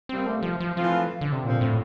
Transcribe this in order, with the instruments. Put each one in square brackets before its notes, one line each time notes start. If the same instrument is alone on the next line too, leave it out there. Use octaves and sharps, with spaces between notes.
[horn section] C3 G3 A#3 [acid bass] C4
[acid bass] A3
F3
F3
[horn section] E3 A3 C4 F4 [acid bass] F3
[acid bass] D3
C3
[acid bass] A#2 [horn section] D3 F3 C4
[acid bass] A2